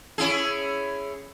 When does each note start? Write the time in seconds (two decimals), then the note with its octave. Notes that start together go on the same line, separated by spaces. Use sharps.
0.18 C#4 E4 G#4